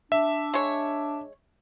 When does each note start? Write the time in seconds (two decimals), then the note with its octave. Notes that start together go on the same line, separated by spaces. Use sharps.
0.12 D4 E5
0.54 G#3 C#5